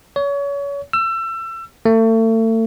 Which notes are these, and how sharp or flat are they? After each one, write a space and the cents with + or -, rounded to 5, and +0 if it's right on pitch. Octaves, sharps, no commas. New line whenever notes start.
C#5 +30
E6 +30
A3 +35